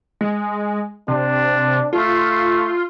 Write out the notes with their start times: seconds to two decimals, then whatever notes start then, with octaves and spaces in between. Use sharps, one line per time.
0.21 G#3
1.08 C3 D4
1.93 A3 F4